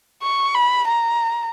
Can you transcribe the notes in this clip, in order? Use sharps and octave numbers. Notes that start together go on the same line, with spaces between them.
C#6
B5
A#5